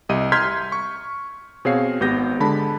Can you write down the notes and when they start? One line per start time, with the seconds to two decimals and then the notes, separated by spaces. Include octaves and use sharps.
0.09 C2 G4 D#5 D#7
0.32 A#5 C6 F6 G6 G#6 B6
0.72 C#6
1.65 B2 C4 G#4 C#5 F5 C7
2.00 G#1 B3 G4 G6 A#6
2.40 D3 G#3 A5 B5